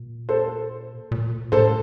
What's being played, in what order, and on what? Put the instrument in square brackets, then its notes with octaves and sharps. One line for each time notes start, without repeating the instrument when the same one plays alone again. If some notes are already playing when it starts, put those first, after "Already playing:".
Already playing: [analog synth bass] A#2
[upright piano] A4 C5
[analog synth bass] A#2
[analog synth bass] A2 [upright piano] A4 C5